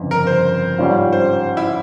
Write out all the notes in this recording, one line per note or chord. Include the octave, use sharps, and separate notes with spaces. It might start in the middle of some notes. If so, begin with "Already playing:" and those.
Already playing: G1 F2 C#3
A#4
C5
G#2 G3 C#4 F4
C5
E4